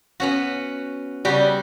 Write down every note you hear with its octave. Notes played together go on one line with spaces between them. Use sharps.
B3 C#4 F#4
C#3 G3 F#4 G4